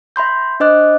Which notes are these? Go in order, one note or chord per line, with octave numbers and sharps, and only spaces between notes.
E5 B5 C6 G6
D4 C5 D#5 D6 F#6